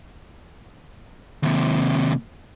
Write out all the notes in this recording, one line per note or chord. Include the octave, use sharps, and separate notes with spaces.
D#2 C3